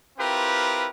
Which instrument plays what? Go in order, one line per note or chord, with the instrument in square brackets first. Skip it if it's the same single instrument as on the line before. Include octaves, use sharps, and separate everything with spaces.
[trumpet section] C4 E4 F4 G4 A#4 B4